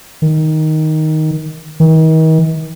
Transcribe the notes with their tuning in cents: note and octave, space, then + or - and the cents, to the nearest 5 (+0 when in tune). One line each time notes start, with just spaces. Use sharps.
D#3 +5
D#3 +40